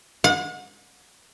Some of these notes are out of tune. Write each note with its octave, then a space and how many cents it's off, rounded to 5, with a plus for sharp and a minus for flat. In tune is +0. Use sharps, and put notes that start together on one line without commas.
F#5 -35